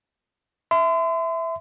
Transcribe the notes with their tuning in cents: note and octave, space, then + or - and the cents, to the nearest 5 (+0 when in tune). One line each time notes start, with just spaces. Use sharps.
E5 -5 C6 -40